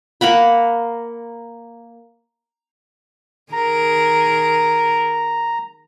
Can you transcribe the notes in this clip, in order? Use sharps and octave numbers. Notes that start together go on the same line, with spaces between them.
A#3 A#4 F#5 B5
D#3 G#4 A#4 A#5